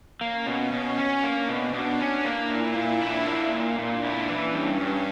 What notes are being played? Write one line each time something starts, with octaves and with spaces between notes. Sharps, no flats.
A#3 C#4
B2
B2
C#4
A#3 D4
B2
B2 D4
C#4
A#3 E4
A#2
A#2 D4
E4
A#3
A#2
A#2 D4
E4
E3 C#4
G2
G2 C#4